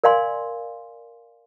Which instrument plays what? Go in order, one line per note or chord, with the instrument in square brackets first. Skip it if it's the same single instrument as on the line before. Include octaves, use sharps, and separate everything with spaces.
[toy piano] A#4 D5 F5 G#5 C6